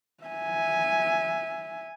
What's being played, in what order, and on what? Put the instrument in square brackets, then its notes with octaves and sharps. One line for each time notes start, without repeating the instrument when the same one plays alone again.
[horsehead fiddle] E5 G#5